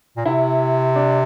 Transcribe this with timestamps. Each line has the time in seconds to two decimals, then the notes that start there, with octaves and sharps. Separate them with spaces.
0.17 A#2
0.25 C3 E4
0.96 D4